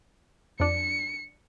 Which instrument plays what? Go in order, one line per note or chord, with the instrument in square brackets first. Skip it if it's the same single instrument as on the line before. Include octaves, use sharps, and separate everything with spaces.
[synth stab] F2 D4 [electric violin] C#7